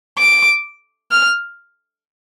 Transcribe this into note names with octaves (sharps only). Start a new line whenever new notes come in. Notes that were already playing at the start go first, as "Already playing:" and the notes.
D6
F6